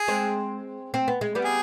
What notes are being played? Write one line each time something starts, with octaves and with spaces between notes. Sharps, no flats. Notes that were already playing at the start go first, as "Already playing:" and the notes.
Already playing: G#4
G#3 C4
C4
B3
G#3
G3 B3
G#4